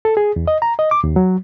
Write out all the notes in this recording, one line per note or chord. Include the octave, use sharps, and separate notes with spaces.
A4
G#4
E2
D#5
A#5
D#5
D6
D#2
F#3